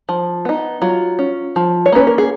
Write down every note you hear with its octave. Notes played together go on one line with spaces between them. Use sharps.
F3
B3 D#4
F#3 F4
C#4
F3
C#5
A#3 C#4 B4
A#4
G#4